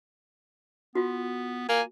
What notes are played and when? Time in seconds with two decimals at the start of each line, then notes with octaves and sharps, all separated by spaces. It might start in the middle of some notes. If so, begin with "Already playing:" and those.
0.95 B3 F4 F#4
1.69 A#3 G#5